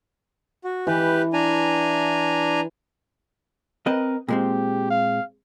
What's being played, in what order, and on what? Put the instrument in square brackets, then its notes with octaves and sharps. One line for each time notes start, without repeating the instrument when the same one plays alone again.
[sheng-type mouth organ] F#4
[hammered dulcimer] E3 [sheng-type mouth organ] G4 B4
[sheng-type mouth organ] D4 G#5 A#5
[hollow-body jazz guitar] C4 B4 D#5 [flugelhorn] A#4
[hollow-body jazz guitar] A#2 G#3 C4 [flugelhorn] G4
[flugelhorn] F5